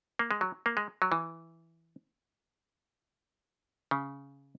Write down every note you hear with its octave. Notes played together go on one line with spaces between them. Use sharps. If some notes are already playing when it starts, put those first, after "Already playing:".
A#3
G#3
F#3
A#3
G#3
F#3
E3
C#3